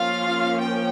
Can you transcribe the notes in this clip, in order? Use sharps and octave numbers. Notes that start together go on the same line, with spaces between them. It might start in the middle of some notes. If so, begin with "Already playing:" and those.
Already playing: F3 A#3 C#4 F4 F5
G5